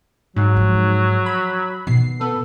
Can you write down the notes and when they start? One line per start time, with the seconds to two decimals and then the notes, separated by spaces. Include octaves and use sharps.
0.36 G#2 F#3
0.56 F3
1.26 B5
1.87 B2 D#3 C7
2.21 B3 A4